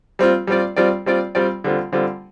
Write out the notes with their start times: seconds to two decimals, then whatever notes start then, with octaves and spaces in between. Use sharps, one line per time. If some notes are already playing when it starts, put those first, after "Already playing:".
0.19 G3 C4 F4
0.47 G3 C4 F4 D5
0.76 G3 C4 F4 D5
1.06 G3 C4 F4 D5
1.35 G3 C4 F4 D5
1.64 D3 G3 C4 F4
1.92 D3 G3 C4 F4